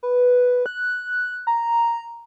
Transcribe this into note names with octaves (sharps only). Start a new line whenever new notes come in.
B4
F#6
A#5